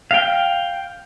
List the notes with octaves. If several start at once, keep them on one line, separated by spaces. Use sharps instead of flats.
F5 G5